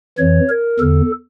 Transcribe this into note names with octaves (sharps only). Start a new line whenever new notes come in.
F2 E3 C#5
A#4
E2 D3 A4